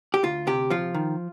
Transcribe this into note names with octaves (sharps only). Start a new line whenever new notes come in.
G4
D2 F4
C3 G4
F3 F4
D#3